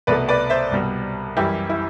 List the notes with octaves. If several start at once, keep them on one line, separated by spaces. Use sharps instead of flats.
C2 B2 A3 B4 D5
B4 D5
C5 E5
C2 B2 G3
F#2 E3 G3 E4 G4
E4